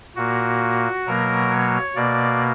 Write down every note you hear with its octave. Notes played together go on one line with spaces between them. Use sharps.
A#2 A#3 F#4
B2 F#3 A#3 A#4
C#5
B2 A#3 D5